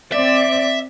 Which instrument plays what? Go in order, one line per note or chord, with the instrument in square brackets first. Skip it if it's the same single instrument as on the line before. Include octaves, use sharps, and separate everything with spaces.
[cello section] C4 D5 [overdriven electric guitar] E5